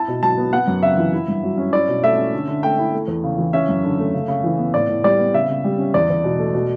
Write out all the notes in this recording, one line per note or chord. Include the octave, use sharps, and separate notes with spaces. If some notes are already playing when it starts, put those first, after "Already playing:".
Already playing: E4 A5
B2
F#3 A5
B3
B3 F#5
F#2
C#3 E5
E3
E4
G2
F#3
C#4
E4 D5
B2
A3 E5
C#4
D3
D3
A3 G5
E4
A3
E2
C#3
E3
C#4 E5
F#2
D3
A3
C#3
C#3
E3
B3
A2 D5
A2
G3 D5
B3
C#3 E5
C#3
G3
C#4
E2 D5
E2
B2
A3
B2